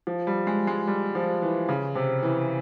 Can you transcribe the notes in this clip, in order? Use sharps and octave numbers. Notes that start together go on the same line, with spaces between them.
F3
G3
G#3
G#3
G3
F3
E3
C#3
C3
E3